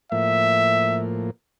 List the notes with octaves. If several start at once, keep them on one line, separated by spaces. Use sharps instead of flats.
A2 F3 A#3 E5